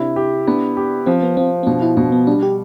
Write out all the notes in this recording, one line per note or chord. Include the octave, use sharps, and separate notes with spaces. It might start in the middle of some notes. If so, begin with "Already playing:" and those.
Already playing: C3 D4 E4
G4
B3 D4
G4
F3 C4
B3
F3 C4
C4
B2 D4
E4
B2 D4
B3
G3 D4
G4